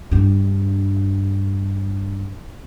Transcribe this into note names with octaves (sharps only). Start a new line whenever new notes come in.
G2 D4